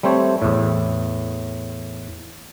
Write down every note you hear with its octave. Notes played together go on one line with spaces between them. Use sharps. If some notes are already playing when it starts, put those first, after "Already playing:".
G3 A3 C4 C5 C#5
E2 A2